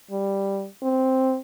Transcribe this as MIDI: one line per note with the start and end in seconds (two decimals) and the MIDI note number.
0.11 0.67 55
0.82 1.38 60